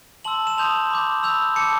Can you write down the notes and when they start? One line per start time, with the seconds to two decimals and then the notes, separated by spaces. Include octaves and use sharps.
0.25 A5 C6 E6 F#7
0.47 E7
0.57 A5 C6 D#6 G6 F7
0.90 B5 D6 G6
1.23 B5 E6 G6 F7
1.56 A5 D6 G6 C#7